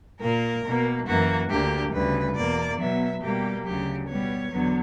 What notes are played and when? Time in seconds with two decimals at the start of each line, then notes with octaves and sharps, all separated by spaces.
0.20 A#2 A#3 A#4
0.64 B2 A#3
1.06 F#2 E3 A#3 F#4
1.49 D2 D3 A#3 G4
1.92 D2 C#3 G3 B4
2.36 E2 B2 A#3 D5
2.78 B2 F#3 B3 E5
3.21 B2 G3 A#3 G4
3.65 D2 C#3 F#3 G4
4.08 B2 G3 B3 C#5
4.51 E2 D3 F#3 B3